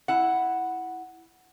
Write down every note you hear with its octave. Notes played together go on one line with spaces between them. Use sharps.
E4 F#5